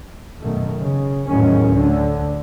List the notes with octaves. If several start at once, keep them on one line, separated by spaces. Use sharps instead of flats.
F#2 B2 D#3 A3
C#3
E2 A2 D#3 F#3 C#4
D2 D3